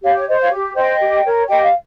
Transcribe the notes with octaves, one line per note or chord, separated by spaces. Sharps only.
G4 C#5 F5
C#5
C5 D#5
C#5 F5
G4
C5 D#5 G5
G4
A#4 C#5
G4 D#5 G5
F5